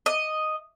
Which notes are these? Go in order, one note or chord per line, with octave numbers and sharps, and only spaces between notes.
D#5